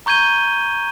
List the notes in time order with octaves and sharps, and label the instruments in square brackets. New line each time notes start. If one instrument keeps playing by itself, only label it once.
[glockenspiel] A#5 C#6 G6 G#6 D#7 G7